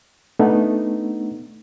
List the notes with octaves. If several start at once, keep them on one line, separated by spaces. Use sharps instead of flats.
A3 B3 D4 D#4